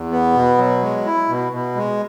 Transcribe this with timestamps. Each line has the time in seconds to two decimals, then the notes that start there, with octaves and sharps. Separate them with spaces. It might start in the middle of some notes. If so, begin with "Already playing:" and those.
Already playing: E2
0.11 B3
0.34 B2
0.58 F#3
0.82 G#3
1.05 E4
1.29 B2
1.52 B2
1.76 G#3